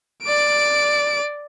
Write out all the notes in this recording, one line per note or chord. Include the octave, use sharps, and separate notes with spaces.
D5 D7